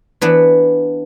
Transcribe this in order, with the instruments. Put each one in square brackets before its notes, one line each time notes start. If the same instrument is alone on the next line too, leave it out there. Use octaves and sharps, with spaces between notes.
[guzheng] E3 B3 D4 B4